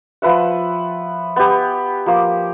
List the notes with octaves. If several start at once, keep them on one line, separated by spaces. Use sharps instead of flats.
F3 B4 E5 F#5
B3 G4
F3 A#3 D6